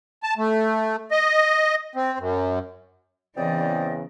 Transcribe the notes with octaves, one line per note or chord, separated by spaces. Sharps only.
A5
A3
D#5
C4
F#2
E2 C#3 E3 C4 D5 D#5